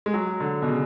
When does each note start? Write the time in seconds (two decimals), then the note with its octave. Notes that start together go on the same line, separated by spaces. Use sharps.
0.06 G#3
0.14 F#3
0.40 D3
0.62 B2
0.68 C#3